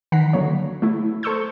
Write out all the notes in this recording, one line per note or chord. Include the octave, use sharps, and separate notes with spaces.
D#3 E3 F#5 A#5 B6 C7
D3 F#3 A#3 C#5
A3 E4
A4 C5 C#6 E6 G6